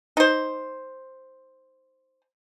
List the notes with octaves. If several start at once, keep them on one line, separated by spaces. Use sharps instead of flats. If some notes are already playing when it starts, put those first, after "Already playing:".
D#4 C5